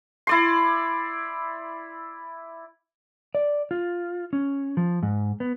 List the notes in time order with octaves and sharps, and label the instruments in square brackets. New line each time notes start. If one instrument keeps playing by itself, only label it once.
[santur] E4 D5 C6
[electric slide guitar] D5
F4
C#4
F3
G#2
B3